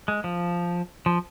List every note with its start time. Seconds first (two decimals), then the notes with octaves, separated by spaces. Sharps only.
0.08 G#3
0.24 F3
1.06 F3